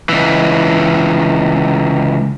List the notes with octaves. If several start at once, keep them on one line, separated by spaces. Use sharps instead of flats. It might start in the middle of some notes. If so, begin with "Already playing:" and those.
C#2 E3